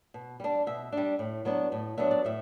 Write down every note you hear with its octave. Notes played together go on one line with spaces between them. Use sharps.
B2
G3 D4
B2 E5
G3 D4
A2
F#3 B3 D4
A2
F#3 B3 D4 E5
D5
A2 E5